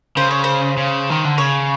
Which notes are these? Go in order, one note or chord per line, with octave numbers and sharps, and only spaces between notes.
C#3 C5
C#5
C5
C#3
D#3
D3
C#3 C#5